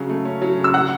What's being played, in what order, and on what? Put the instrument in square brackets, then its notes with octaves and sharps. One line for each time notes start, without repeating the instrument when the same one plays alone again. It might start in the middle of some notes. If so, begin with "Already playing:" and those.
Already playing: [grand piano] C#3 F#3
A3
C#4
F#3
C#3
[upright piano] E6
[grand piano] F#3 [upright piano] F#5 F#6